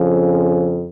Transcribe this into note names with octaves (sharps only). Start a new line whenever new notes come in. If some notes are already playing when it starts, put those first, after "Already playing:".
Already playing: F2 C#3 F3